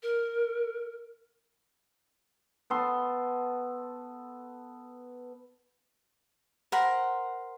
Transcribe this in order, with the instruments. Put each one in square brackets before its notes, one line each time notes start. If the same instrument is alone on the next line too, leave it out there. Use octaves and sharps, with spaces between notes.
[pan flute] A#4
[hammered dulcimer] B3 A4 C6
[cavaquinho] A#4 C5 F#5 B5